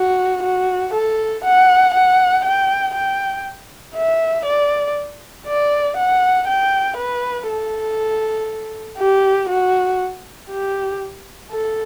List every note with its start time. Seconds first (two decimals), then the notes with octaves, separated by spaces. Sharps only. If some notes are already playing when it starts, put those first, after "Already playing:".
Already playing: F#4
0.43 F#4
0.94 A4
1.45 F#5
1.94 F#5
2.45 G5
2.95 G5
3.95 E5
4.45 D5
5.47 D5
5.97 F#5
6.48 G5
6.97 B4
7.48 A4
8.98 G4
9.49 F#4
10.50 G4
11.51 A4